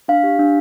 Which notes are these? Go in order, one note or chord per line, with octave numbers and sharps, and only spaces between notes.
D4 F5
G4
D4